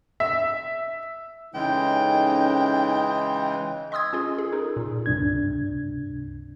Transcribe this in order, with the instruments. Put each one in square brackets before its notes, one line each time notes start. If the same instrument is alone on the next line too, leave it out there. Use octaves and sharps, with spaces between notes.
[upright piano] E5
[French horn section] F2 C#4 D#4 [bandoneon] C#3 E3 G#3 [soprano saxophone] G5
[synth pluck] D#5 C6 D#6 E6 G#6
C#4 F4 G#4
G#4
D#4 A4 A#4
A#2
[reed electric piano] C#2 G2 C3 D4 G#6